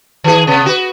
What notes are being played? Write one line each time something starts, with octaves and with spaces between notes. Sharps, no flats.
D#3 G#4
C3 B3
F#4 B4